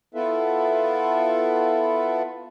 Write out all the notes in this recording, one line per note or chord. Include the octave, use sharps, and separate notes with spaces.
B3 E4 F4 A4 B4 E5